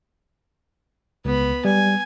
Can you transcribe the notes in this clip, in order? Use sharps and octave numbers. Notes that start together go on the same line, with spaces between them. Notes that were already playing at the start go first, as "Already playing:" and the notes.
C#2 B3 B5
G3 G#5